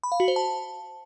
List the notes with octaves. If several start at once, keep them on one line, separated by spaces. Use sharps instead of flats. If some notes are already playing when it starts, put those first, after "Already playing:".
B5
F5
F#4
C5
A5